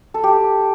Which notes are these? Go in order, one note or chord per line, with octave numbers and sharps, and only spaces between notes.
A4
G4